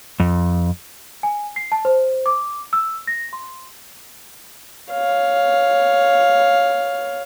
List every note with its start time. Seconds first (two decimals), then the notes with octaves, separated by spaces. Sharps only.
0.20 F2
1.23 G#5
1.56 C7
1.72 A5
1.85 C5
2.26 D6
2.73 E6
3.07 A#6
3.33 C6
4.91 C#5 F5